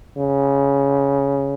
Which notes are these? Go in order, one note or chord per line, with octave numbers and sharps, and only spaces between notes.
C#3